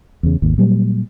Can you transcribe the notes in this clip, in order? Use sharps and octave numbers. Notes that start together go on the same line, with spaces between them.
E2 C#3
G#1 D#2
A#2 F#3 G3